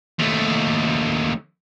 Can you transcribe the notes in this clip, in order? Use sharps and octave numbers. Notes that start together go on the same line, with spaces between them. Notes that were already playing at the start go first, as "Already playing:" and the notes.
D#2 A3